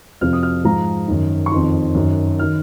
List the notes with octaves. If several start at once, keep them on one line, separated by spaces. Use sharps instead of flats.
F2 C3 F3 F6
D#6
F6
G#2 F3 A#5
F#2 D#3
C#6
F2 D#3 C6
F#2 D#3
D#3 F6